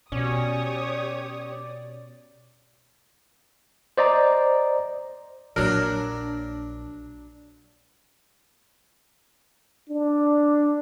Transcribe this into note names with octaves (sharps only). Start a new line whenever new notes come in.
B2 C#4 G4 C#5 D5 D#6
C5 D5 D#5 A#5
A#1 F#3 A#3 D4 A#4
D4